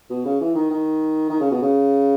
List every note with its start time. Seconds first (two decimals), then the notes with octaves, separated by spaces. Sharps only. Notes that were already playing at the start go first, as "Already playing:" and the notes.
0.10 B2
0.25 C#3
0.41 E3
0.55 D#3
0.70 D#3
1.30 D#3
1.40 C#3
1.51 B2
1.62 C#3